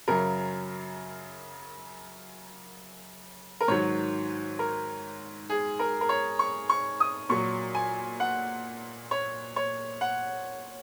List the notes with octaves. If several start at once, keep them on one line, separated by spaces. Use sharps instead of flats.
F#2 C#3 F#3 A#4
A#4
G#2 D#3 F#3 C#5
A#4
G#4
A#4
A#4
C#5
C#6
C#6
D#6
A#2 F#3 C#6
G#5
F#5
C#5
C#5
F#5